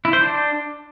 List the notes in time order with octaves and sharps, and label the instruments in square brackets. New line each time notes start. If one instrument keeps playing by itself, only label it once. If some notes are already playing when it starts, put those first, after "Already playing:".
[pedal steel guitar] E4
C5
D4